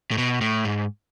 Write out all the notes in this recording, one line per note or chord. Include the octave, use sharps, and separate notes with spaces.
A2
B2
A2
G#2